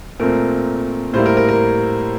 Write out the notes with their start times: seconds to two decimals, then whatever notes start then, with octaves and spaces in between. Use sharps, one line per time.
0.20 A#2 A3 C4 A#4
1.13 A2 G3 A#3 E4 C5
1.26 A#4
1.37 A#4
1.49 A#4